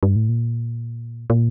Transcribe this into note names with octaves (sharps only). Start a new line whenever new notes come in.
G2
A2
A#2
A#2